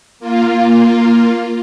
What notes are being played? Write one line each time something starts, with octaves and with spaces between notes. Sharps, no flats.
A#3 F4